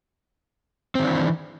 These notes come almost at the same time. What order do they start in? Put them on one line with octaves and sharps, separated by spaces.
C4 D#3 D4 E3